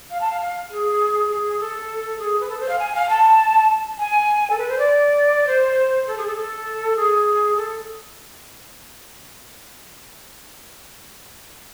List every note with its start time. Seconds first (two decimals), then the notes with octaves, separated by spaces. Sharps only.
0.11 F5
0.21 A5
0.31 F5
0.41 F5
0.71 G#4
1.30 G#4
1.60 A4
2.19 G#4
2.40 B4
2.49 A4
2.60 C5
2.69 F5
2.79 G#5
2.95 F5
3.09 A5
3.99 G#5
4.50 A4
4.58 B4
4.69 C5
4.78 D5
5.47 C5
6.07 A4
6.18 G#4
6.27 A4
6.38 A4
6.96 G#4
7.57 A4